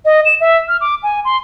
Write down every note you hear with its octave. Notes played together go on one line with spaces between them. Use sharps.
D#5
E7
E5
F6
D6
G#5
C6